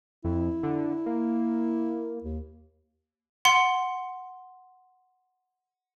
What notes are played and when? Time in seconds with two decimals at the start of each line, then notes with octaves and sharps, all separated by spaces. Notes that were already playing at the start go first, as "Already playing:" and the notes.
0.24 F2 E4
0.63 D3
1.06 A#3
2.24 D#2
3.45 F#5 C6